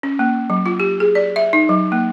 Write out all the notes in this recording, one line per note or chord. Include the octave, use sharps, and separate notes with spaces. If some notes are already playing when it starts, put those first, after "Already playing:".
C#4
A#3
F#3
F4
G4
G#4
D5
E5
D#4
F#3
A#3